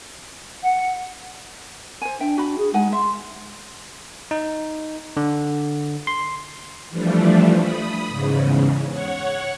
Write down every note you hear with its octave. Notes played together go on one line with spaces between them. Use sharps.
F#5
C5 G#5
D4 E5 G5
F#4 B5
G#4
G#3 D#4 F#5 G#5
E5 C6
D#4
D3
C6
E3 F3 G3 A3 D4
B5 D#6
E2 G#2 C#3
C#5 F#5 C#6